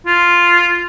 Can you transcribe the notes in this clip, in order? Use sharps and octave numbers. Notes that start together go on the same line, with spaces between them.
F4